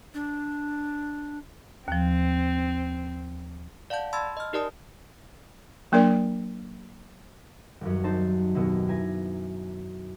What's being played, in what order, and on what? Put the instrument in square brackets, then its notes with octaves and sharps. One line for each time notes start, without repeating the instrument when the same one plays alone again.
[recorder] D4
[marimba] D#2 F3 [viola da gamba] C4
[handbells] D5 F5 F#5 A5 G6
A5 B5 C6 E6 G#6 A6
D#5 F6
D#4 G4 A#4 D5 A5 D#6
[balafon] F#3 A#3 D4 A#4 D5
[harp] D#1 F#2
C4 D#4 C5 A5
D#2 B2 B3 E6
E4 B4 G#5 A#5